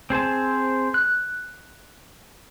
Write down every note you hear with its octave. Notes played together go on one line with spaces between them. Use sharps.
C4 G#4 C5 A5
F#6